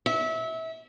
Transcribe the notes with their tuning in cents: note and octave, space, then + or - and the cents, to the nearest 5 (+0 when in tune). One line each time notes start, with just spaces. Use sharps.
E5 -25